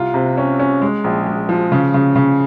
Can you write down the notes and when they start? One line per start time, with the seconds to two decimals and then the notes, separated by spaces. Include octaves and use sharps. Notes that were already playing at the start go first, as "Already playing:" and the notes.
Already playing: C2 F4
0.14 C3
0.37 C#4
0.59 C#4
0.81 G#3
1.04 A#1
1.26 G#3
1.49 F3
1.72 C#3
1.94 C#3
2.16 C#3